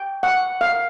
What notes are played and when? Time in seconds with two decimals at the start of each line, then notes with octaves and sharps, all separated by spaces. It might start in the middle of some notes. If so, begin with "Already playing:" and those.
Already playing: G5
0.23 F#5
0.61 F5